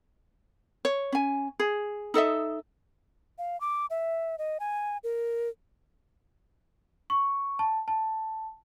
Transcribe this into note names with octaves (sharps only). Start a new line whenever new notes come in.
C#5
C#4 G#5
G#4
D#4 A4 D#5 E5
F5
D6
E5
D#5
G#5
A#4
C#6
A5
A5